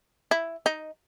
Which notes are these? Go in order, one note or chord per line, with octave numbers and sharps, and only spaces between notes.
E4
D#4